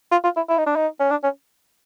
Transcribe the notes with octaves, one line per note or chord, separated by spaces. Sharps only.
F4
F4
E4
E4
D#4
D4
D#4
C#4
D4
C#4